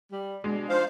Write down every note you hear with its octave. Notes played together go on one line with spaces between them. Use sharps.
G3
B2 G3 G#3 D4
F3 D4 D#4 C5 F5